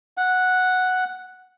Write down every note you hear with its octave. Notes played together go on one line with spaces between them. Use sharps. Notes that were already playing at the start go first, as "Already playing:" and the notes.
F#5